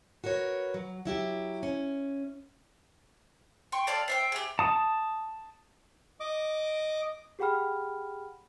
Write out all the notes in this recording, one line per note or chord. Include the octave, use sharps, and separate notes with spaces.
F#4 A#4 B4 C#5
F#3
F#3 E4 G4
C#4
G5 C6 C#6
A4 D5 F5 A5
C5 E5 G5
G4 G#4
A5 D#6
D#5 D6
G4 G#4 F#5 G5 B5 F6